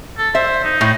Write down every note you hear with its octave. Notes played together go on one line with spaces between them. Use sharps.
A4
C5 E5
D#4
A2